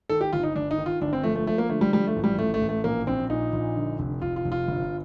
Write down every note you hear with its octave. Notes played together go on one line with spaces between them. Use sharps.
D#3 A4
G4
G1 F4
D#4
G1 D4
D#4
D#3
F4
G1 D4
C4
F3 A3
A3
F3 A3
A#3
D3 A3
G3
F3 G3
A3
A1
G3
A1 A3
A3
A1
A3
A#1 A#3
A#1 C4
A#2 D#4
A#1
D3
F1
F1 F4
F4
F1
F4
G1